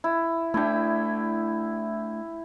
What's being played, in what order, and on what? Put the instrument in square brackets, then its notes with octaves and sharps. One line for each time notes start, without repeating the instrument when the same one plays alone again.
[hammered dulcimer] E4
[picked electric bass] A3 D4 [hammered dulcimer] E4 G5